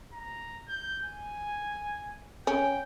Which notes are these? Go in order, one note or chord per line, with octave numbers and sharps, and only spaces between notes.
A#5
G6
G#5
C#4 G5